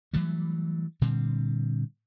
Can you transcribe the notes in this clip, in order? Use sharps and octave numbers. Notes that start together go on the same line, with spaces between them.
E3 F#3 G3 A3
A#2 D3 G3 C4